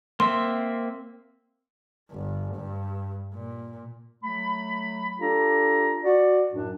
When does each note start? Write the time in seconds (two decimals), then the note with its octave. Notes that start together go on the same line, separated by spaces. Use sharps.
0.20 A#3 C4 E5 C6
2.12 G1
2.55 G2
3.33 A#2
4.24 F#3 A3 B5
5.20 D4 F4 G4 A4 A#5
6.04 F#4 D5
6.52 F#2 A2 F#3 D4